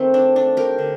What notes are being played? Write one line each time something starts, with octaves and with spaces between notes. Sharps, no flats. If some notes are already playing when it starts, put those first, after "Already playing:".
Already playing: D#3 A3 C4
D4
A3 D4
G4 A#4
D3